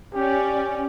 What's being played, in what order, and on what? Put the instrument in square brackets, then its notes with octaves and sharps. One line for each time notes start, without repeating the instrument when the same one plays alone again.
[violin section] C#4 D5 [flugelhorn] G4